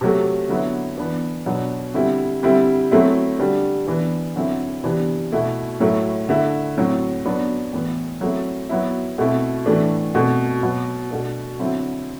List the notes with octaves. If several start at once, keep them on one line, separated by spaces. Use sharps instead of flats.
C3 F#3 A3
D3 F#3 B3 E4
E3 B3 D4
B2 F#3 B3 D4
D3 G3 C4 E4
D3 G3 C4 E4
F#3 A3 C4 E4
D3 G3 D4
E3 B3 D4
D3 F#3 C4 E4
C3 E3 B3 D4
B2 A3 E4
A2 F#3 A3 E4
D3 A3 E4
A2 F#3 C4
F#3 B3 D4
A2 E3 B3
F#3 A3 C4 E4
F#3 B3 E4
B2 A3 C4 E4
A2 E3 A3 D4
B2 A3 C4
B2 F#3 B3
B2 A3 D4
D3 F#3 C4 E4